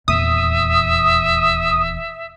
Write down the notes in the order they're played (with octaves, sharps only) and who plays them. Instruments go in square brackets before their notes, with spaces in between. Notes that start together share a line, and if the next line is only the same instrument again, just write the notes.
[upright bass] D#1 E2 [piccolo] E5 [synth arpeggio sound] D#6